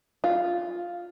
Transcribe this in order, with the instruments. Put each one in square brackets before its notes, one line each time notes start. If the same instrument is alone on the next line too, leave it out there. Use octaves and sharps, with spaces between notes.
[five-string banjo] F4